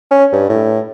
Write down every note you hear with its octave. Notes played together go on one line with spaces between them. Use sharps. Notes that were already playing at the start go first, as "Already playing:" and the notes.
C#4
G2
A2